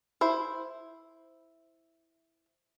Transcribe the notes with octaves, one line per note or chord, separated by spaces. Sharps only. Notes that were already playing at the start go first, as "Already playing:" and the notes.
E4 C5